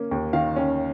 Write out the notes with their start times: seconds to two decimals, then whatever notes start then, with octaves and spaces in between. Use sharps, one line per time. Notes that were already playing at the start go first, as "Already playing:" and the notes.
Already playing: A#3 C#4
0.11 D#2
0.33 D#3 F5
0.56 C#4